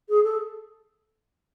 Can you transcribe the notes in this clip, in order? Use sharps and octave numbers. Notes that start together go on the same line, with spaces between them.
G#4
A4